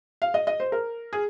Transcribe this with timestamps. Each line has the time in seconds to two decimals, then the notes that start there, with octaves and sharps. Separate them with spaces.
0.22 F5
0.34 D#5
0.47 D#5
0.60 C5
0.72 A#4
1.13 G#4